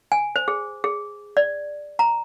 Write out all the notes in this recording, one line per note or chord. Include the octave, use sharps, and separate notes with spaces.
G#5
C5
G#4
G#4
D5
A#5